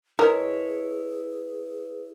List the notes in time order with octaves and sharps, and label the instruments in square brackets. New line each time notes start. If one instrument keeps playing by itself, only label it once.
[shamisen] G#3 A#4 [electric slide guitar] E4 C#5 [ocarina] G#4 [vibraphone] B4